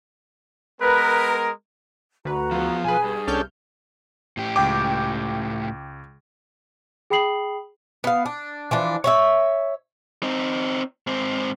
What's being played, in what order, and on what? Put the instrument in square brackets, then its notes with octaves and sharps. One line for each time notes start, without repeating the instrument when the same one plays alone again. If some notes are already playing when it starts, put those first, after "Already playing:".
[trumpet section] G#3 B3 A#4 [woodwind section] B4
[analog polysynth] D2 B4 [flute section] F#4 A#5
[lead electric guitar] E2 B3 [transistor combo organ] F3
[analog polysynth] B1 B4 [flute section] G#4 [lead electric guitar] G#5
[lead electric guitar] G2
[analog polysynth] C2 F6 G6 [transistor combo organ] C#4 D4 A4
[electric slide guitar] A2 G4
[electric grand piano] C#2 G5 D6
[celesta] G#4 G5 B5 D#6 C7 F#7
[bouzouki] B3 F5
D4
E3 F3 D4
C#5 D#5 E5
[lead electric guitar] C4 D#4
G#2 C4